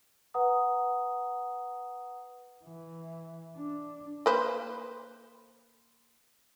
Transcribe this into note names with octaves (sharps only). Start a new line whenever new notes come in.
B4 F#5 A#5 D#6
E3
D4
A#3 B4 C5